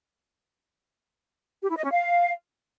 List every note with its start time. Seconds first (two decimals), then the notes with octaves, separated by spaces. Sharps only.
1.63 G4
1.70 E4
1.77 D#5
1.85 C#4
1.92 F5